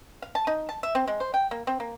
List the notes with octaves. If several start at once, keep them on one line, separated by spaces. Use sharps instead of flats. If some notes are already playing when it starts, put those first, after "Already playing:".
F5
A5
D#4
A5
E5
C4
G#3
C5
G5
A#3
C4
A#3